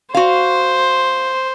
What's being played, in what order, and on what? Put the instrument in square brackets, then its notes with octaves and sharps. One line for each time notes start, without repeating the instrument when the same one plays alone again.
[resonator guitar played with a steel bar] F#4 F5 [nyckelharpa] C5